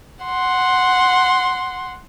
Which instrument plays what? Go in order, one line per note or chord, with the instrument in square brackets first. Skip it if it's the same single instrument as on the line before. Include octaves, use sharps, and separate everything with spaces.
[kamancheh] F#5 C6